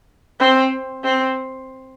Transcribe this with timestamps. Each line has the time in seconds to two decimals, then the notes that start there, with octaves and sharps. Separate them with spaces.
0.40 C4
1.04 C4